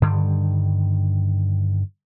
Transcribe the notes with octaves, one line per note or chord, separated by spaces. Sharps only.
G2 D3 D#3 G3